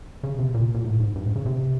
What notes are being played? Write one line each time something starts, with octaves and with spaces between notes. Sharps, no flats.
C#3
C3
A#2
A#2
A2
G#2
G2
G#2
C#3
C3